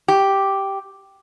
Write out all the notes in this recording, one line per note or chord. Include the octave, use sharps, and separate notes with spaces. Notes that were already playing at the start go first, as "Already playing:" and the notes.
G4